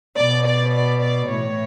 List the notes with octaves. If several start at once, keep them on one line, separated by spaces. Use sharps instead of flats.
B2 D5
D5
D5
D5
A2 E3 C#5